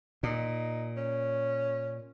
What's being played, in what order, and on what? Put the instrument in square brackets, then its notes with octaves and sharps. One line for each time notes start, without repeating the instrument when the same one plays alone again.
[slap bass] A#2 [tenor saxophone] D#4
[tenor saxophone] C#4